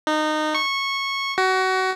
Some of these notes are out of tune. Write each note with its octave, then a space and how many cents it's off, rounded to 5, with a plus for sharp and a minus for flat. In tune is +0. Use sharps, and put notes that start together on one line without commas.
D#4 -20
C#6 -15
F#4 +25